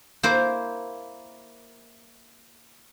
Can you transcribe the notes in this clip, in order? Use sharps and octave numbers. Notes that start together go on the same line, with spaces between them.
A#3 E4 A#4 C5